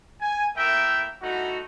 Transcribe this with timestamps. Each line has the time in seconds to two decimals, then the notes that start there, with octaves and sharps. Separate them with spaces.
0.21 G#5
0.57 A3 A#3 E4 A#4 E5 G5
1.22 G3 A3 D#4 E4 F#4